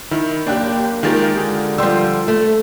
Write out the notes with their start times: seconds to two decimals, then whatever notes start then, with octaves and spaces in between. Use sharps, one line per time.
0.11 D#3 E4
0.47 F#1 A#3 D4 G4 G5 F#6
1.03 D#3 G#3 F4 G4 A#4 A6
1.37 D3 G#3
1.78 F3 G3 C6 E6
2.28 A3